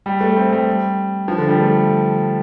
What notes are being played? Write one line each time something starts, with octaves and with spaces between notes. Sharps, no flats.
G3
A3
C4
G3
F3
D3
G3
A3